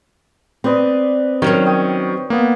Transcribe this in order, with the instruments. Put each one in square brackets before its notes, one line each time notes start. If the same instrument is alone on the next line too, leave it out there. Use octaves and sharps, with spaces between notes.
[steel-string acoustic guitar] C4 [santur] B4 D5 D#5
[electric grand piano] D#3 [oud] F#3 C#4 A#4
[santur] C#5 G5 D#6
[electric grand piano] A#3 B3